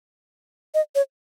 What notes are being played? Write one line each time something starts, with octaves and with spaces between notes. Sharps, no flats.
D#5
C#5